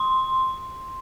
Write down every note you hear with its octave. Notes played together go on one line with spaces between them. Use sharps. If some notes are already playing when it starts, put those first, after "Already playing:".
Already playing: C6